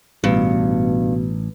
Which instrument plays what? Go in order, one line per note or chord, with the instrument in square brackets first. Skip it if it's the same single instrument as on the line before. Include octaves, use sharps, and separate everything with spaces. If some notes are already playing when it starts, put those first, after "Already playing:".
[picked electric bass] A1 [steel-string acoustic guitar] G2 [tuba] B2